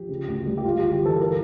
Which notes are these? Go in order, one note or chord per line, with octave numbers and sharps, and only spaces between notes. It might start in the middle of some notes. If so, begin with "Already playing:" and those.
Already playing: F3 G4
C#3
D2
G3
G4
G2 F4
G4
G1
G4
E3 A4
A#4